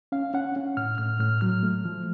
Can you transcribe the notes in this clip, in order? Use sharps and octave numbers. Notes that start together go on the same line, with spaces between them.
C#4 F5
C#4 F#5
C#4
A2 F6
A2 F6
A2 F6
F#3 F6
A3
F3